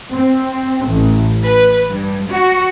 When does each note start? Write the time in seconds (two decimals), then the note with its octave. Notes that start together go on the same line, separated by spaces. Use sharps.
0.13 C4
0.89 A1
1.43 B4
1.91 G2
2.30 F#4